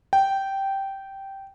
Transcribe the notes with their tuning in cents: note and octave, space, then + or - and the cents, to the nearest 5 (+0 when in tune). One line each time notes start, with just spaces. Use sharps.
G5 -10